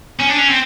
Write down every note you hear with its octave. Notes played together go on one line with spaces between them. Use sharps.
C#4
D4
C#4
C4